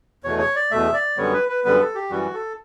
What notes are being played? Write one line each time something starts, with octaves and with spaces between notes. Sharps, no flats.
E2 B2 A3 C#5
C#5
D5
E2 B2 A3 E5
D5
F#2 D3 G3 B3 C#5
B4
B4
F#2 D3 G3 B3 B4
A4
G4
F#2 E3 G3 F#4
A4